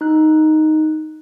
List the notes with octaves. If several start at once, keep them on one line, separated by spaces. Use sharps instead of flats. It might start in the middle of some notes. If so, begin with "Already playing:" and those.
D#4 F#6